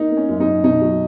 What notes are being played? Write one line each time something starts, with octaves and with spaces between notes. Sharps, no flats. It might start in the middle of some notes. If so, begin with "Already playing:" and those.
Already playing: A#3 D#4
A#3
C#4
F#2
D#4
F#2
B2 D#4
F#3